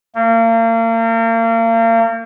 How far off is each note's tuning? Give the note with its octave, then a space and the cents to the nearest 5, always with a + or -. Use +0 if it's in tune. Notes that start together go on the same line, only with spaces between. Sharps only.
A#3 -35